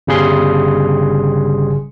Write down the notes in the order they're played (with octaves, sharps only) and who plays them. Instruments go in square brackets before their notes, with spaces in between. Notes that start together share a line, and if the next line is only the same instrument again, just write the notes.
[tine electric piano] G1 C#3 G3 G#4 C6